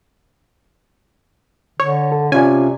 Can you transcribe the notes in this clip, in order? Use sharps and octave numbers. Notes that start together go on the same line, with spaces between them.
D3 C#5
A4
C3 C#4 F4 D5 G#5